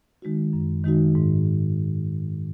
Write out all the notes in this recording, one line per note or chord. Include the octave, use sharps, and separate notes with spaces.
D#3 G#3 D#4 F#4
F#2
D#3 G#3 D#4 F#4
G#2